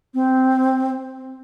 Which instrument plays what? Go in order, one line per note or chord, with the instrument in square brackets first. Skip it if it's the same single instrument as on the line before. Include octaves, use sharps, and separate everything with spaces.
[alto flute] C4